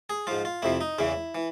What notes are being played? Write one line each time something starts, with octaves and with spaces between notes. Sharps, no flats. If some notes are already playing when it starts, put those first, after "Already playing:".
G#4
G#2 F3 F4
F4
F2 C3 F3 E4
D#4
E2 C#3 E3 E4
E3